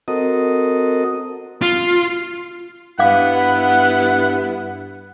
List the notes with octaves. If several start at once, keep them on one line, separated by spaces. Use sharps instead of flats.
C4 F#4 A4 A#4 D#5 D#6
F4
G2 B3 E4 F5 F#5 D6